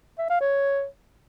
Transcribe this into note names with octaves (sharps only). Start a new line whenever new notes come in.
E5
F5
C#5